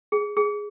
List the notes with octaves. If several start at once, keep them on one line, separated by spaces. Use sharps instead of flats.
G#4
G#4